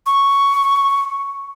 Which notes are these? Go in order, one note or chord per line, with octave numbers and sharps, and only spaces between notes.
C#6